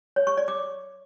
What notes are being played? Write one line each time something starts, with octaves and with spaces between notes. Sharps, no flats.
C#5
C#6
D5
D6